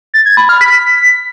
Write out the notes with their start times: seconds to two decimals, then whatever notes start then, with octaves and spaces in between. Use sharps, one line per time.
0.14 A6
0.25 G#6
0.37 B5
0.49 F6
0.61 B6